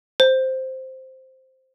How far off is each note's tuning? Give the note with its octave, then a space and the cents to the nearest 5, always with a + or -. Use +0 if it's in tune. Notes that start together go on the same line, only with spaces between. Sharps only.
C5 +0